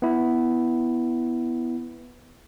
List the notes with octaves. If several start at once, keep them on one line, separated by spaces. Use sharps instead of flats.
B3 E4